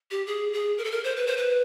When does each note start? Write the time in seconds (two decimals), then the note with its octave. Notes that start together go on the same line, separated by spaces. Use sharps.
0.11 G4
0.27 G#4
0.53 G#4
0.78 A#4
0.84 A4
0.91 A#4
1.04 C5
1.16 B4
1.27 C5
1.37 B4